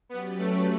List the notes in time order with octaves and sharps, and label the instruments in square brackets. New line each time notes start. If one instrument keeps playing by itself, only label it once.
[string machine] F#3 C#4 G4 B4 D5 [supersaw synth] B3
[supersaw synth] A3